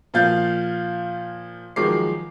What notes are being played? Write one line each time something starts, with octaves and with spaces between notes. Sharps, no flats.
A#2 F3 F4 F5 G6 A6
D#3 F3 F#3 G#3 D6 C7